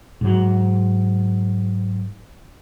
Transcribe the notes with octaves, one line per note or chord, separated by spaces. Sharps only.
G#2 F#3